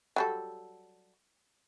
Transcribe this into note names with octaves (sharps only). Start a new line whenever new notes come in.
F#3 G3 A4